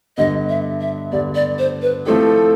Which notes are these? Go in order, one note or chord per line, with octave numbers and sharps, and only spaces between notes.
G2 D3 G3 B3 D#5
E5
E5
G2 D3 G3 B3 D5
D5
C5
B4
F3 A3 C4 E4 G4 A4